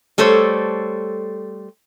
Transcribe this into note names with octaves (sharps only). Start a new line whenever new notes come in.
G3 A3 A4 C5 C#5